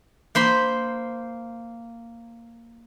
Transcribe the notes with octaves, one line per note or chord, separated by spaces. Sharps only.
A#3 C5 B5 C6